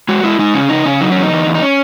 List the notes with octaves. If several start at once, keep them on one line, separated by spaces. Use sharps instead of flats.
G#3 F#4
G#3 E4
G#3 D#4
C#3 C#4
C#3 D#4
C#3 C#4
F#3 D#4
E2 C#4
D#4
E2
E2
D#4
C#4